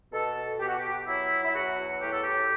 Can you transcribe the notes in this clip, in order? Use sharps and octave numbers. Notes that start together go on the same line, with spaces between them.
B2 A4
B2 G4
F#4
G4
F#3 E4
E4
E2 F#4
A2 G4
A4
G4